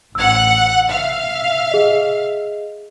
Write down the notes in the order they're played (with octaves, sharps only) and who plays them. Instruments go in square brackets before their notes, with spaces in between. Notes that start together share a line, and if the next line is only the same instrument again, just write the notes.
[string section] A1 F#5 [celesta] E6 G#6
[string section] E5 F5
[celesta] G#4 D#5